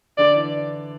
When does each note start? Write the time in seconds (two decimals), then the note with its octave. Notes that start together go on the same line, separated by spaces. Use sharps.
0.18 D3 D5
0.34 E3